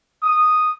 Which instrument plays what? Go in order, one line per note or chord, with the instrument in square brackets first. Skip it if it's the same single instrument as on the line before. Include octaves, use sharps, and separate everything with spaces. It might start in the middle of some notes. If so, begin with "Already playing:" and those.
[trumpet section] D#6